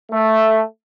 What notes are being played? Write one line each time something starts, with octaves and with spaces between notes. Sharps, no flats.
A3